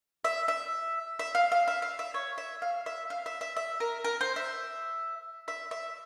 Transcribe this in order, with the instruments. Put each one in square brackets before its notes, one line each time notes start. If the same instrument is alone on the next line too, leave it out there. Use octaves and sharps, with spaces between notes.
[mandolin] E5
E5
E5
F5
F5
E5
F5
E5
C#5
E5
F5
E5
F5
E5
E5
E5
A#4
A#4
C5
E5
E5
E5